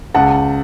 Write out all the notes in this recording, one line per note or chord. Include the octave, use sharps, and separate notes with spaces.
C#2 F#5 A5